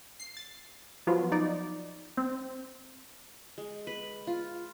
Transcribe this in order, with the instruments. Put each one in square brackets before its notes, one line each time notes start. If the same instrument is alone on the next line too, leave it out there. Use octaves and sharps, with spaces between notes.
[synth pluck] C7
A6
F3 F#3 B3 F4
D#4 D5
C4
[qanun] G#3
B4
F4